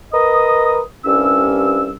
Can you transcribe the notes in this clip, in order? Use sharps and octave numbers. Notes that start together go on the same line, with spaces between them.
A#4 B4 D#5 D#6
C2 G2 C#4 E6